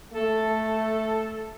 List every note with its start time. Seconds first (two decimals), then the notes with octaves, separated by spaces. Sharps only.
0.14 A3 A4